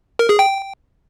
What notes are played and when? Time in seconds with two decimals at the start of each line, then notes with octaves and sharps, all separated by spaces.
0.19 A#4
0.29 G#4
0.39 G5